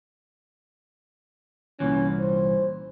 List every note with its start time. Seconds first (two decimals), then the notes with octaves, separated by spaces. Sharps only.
1.80 C2 A#2 E3 C#4
2.20 C5